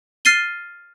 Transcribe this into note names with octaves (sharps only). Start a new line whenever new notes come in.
F6 A6 C7 D#7 G7